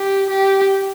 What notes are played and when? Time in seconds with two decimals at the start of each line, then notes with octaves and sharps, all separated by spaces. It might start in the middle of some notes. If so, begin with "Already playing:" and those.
Already playing: G4
0.30 G4